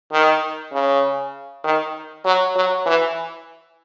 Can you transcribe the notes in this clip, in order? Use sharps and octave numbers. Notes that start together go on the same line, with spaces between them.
D#3
C#3
D#3
F#3
F#3
E3